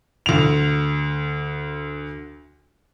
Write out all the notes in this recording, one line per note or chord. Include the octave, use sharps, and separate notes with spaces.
D2 F7